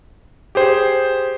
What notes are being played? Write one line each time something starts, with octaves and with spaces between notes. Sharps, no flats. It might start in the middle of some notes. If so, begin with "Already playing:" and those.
G4 G#4 C5